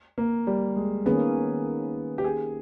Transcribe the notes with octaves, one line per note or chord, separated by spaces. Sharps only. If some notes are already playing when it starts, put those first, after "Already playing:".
A#3
G3
G#3
D#3 A#3 B3 C#4 G#4
G4
G#4